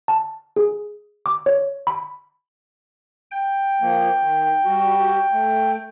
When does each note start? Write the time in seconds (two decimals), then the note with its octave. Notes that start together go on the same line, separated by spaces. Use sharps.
0.08 A5
0.56 G#4
1.26 D6
1.46 C#5
1.87 B5
3.31 G5
3.81 F3 A#3
4.21 D#3
4.66 G3 F#4
5.32 A3